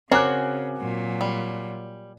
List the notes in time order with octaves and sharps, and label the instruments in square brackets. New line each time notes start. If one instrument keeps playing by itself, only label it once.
[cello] C#3 [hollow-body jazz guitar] C4 [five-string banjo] F#4 A#4 C#5 [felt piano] G#5 D6 F#6
[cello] A#2 F#3
[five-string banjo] G3